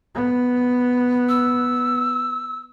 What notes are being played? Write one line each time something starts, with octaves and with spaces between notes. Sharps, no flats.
B3
E6